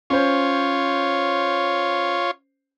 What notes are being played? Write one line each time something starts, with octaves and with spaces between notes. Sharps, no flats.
C#4 F4 C5 C#5